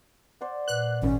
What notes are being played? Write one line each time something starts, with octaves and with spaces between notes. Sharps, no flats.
C5 D5 F#5
A#2 B4 F#6
G#1 C#4